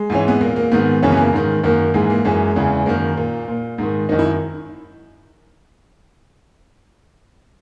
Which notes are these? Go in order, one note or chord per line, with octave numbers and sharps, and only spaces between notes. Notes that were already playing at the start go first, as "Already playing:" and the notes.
Already playing: G#3
G#2 E3 C#4
B3
A#2 A#3
A#3
G#2 D#3 B3
F#2 C#3 E3 C#4
B3
A#3
G#2 D#3
F#2 D#3 A#3
G#2 E3 G#3
A#3
F#2 E3 G#3
E2 C#3 E3
F#2 D#3 A#3
A#2
A#2
G#2 D#3
F#2 D#3 D#4
E4